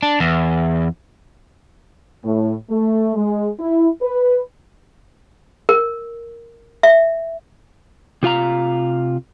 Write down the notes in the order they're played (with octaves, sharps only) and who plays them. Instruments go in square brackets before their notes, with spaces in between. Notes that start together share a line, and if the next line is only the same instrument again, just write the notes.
[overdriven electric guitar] D4
E2
[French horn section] A2
A3
G#3
E4
B4
[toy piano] A#4
E5
[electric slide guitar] C3 F4 F5 A#5